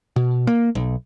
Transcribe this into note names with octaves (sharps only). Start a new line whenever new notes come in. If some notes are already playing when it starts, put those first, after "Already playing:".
B2
A#3
B1